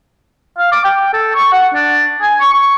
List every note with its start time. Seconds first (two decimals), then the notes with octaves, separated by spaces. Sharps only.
0.58 F5
0.72 D6
0.84 G5
1.13 A4
1.35 C#6
1.52 F#5
1.74 D4
2.22 G#5
2.40 C#6
2.53 C#6